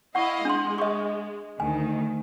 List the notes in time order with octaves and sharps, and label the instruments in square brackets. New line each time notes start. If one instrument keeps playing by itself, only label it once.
[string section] E4 D#5 F5 [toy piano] F#5 C#6
[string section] G#3 [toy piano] D4 C6
[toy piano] D#5 C#6
[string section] D2 D#3 [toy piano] G#5